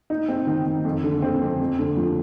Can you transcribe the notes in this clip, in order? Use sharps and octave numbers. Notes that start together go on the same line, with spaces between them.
D#4
C4
D#3
D#3
F2
D3
C4
F2
F2
D3
F3